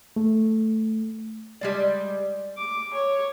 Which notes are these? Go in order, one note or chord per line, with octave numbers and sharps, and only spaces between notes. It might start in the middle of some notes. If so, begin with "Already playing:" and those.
A3
G3 G#3 D5
D6
C#5